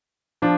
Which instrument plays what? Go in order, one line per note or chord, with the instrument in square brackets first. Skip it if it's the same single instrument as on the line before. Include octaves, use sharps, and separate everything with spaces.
[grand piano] F3 D4